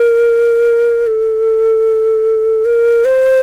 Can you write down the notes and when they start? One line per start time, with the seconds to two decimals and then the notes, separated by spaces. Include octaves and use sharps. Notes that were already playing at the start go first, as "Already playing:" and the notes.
Already playing: A#4
1.07 A4
2.65 A#4
3.05 C5